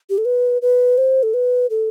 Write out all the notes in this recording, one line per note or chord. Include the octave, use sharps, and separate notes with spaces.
G4
A4
B4
B4
C5
A4
B4
A4